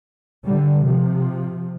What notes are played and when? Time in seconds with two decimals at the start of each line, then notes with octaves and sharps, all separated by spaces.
0.45 D3 G3
0.85 C3 F3